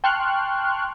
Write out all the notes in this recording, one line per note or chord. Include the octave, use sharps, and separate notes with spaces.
G5 A5 C6 C#6 F6 F#6